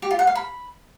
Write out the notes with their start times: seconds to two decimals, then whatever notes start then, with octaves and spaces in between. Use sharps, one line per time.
0.02 G4
0.11 F4
0.19 F#5
0.27 F5
0.35 B5